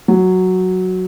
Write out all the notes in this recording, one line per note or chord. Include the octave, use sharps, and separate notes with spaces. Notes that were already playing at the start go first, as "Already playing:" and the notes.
F#3